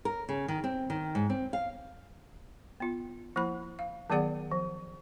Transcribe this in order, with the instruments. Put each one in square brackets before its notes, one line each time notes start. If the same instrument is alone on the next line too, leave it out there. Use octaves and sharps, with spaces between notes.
[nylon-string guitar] A#4
C#3
D#3
C4
D#3
G#2
C4
F5
[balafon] B3 F4
F3 A#3 E4 B5
F5
D#3 F#3 B3 G#4 D5 F#5
F3